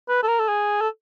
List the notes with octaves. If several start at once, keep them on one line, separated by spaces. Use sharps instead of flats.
B4
A4
A#4
A4
G#4
A4